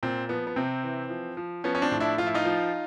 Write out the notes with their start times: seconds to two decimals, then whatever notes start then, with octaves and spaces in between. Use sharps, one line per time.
0.03 A#2 C4
0.29 F3 B3
0.47 B3
0.56 C3 C4
0.83 E3
1.10 F3
1.37 F3
1.64 F3 B3 C#4
1.75 C#4
1.82 C4 D4
1.92 A2
2.00 D4 E4
2.18 F3 F4
2.26 E4
2.34 D#4 F4
2.45 F3